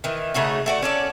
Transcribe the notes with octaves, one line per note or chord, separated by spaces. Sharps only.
D#3 E3
C#3 A3 D#4 F#4
A3 F#4 D5
C#4 A4 D5